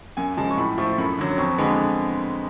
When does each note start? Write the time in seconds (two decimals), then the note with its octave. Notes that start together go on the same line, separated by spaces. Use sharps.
0.17 F#2 G#5
0.37 C#3 F3 G#3 A5
0.51 C#6
0.57 A2 B5
0.78 F3 A3 C#6
0.98 F#2 B5
1.18 D3 F#3
1.38 F2 C#6
1.58 D3 G#3 B3